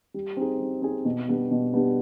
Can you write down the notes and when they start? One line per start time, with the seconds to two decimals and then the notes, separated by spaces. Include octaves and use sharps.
0.14 G3
0.37 C4 D#4 G#4
0.60 G3
0.82 C4 D#4 G#4
1.05 B2
1.28 G3 B3 D4 G4
1.51 B2
1.73 G3 B3 D4 G4